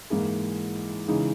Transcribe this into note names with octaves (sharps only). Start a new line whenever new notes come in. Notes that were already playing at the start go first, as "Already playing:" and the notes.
G#2 E3 A#3 E4 G#4
C#3 E3 G#3 D#4